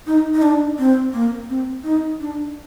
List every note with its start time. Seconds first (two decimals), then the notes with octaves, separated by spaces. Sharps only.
0.07 D#4
0.34 D#4
0.42 D4
0.78 C4
1.13 A#3
1.49 C4
1.84 D#4
2.20 D4